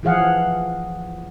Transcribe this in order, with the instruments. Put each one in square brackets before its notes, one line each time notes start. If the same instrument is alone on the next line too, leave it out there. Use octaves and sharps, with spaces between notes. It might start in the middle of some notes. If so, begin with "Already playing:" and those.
[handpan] E3 F3 G#4 F5 F#5